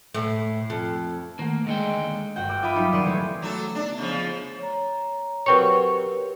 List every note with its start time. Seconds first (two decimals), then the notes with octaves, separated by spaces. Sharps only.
0.14 A2
0.70 F2
1.39 D#3 A3 A#3
1.66 D#2 D3 G#3 G5
2.36 G1 F#4 G5
2.49 D6 E6 G6
2.63 F4 E5 B5 D6 D#6 F6
2.75 F#3 G3 D#4 G4
2.93 D#1 D5 C6 C#6 D#7
3.06 E3 G#3 A3 B3 E4
3.42 C#3 F#3 A3 A4 D6
3.75 E2 D4 D#4
3.98 F2 C#3 F3 C4
4.59 C#5 A#5
5.46 F#3 C4 G4 A#4 B4 C#5 C#6 C#7